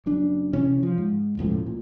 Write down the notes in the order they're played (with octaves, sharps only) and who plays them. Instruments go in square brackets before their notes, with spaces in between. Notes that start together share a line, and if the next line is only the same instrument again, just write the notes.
[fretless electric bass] F#1 F#2 D4
C3 E3 C#4
F3
G#2
E1 C#2 A2 F3
A#2